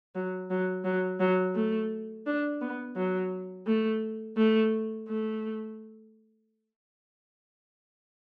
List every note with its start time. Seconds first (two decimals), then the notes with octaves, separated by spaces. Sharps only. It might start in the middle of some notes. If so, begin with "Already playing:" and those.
0.15 F#3
0.50 F#3
0.84 F#3
1.20 F#3
1.55 A3
2.26 D4
2.61 B3
2.96 F#3
3.67 A3
4.37 A3
5.08 A3